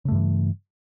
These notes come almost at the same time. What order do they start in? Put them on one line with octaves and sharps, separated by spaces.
C#3 A3 G2 E3